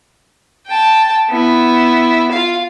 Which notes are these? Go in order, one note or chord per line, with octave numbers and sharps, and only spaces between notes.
G5 A5
B3 E4
F4 F5